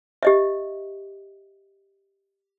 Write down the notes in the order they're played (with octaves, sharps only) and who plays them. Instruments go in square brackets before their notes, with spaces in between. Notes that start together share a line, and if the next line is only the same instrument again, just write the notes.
[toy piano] G4 D#5 E5